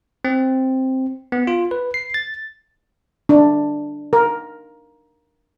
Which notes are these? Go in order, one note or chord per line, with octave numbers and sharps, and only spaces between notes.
C4
B3
F4
B4
C7
A6
D4
A#4